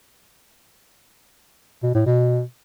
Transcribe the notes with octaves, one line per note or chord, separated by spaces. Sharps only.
B2
A2
B2